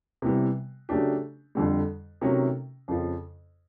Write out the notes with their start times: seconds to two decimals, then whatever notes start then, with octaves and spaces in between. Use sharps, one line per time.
0.22 C3 E3 G3 B3
0.89 C#3 F#3 A3 D4 G4
1.55 F2 D3 G3
2.21 C3 D#3 F#3 A3 C#4
2.88 F2 C#3 F3